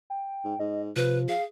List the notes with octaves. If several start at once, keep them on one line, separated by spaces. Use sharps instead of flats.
G5
G#2
G#2 D#5
C3 F3 B4
G#4 F5